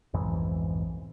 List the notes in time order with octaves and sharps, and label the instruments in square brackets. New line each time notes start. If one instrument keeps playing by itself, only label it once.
[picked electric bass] B1 F2 G#2 E3